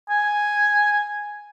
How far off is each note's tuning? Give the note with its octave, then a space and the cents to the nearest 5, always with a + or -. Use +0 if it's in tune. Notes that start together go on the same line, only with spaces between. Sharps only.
G#5 +0